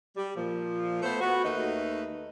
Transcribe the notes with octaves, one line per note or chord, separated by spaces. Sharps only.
G3
A#2 F3
A3 B3 C5
B3 F#4
D#2 A3 D#4 B4